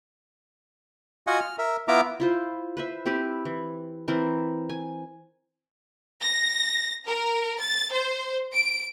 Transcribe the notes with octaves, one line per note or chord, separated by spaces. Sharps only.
F4 F#4 D#5 F#5 G#5
F6
A#4 E5
B3 E4 F4 E5 A#5 D6
E4 F4 C5
B4 C5 E5
C4 E4 G4 B4
E3
E3 C4 A#4 C5
G#5
A#6
A#4
A6
C5
D7